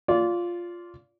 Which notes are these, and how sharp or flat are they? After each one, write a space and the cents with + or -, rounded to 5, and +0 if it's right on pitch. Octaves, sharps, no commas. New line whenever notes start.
F4 +0 D5 -25